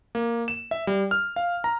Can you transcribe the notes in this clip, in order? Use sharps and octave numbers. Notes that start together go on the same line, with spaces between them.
A#3
E7
E5
G3
F6
F5
A#5